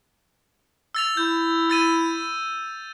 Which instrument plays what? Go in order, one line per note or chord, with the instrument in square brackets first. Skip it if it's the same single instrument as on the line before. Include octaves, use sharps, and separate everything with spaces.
[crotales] E6 A6 F7
[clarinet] E4 [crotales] G6
[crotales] E6 A6 D#7